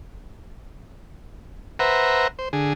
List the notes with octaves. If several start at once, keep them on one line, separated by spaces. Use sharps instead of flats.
B4 C5 E5 F#5 A#5
C5
D3 G#4